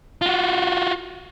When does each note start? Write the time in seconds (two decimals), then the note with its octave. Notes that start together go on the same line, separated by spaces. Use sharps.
0.22 F4 F#4